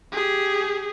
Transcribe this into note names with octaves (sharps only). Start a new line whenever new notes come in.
G4 G#4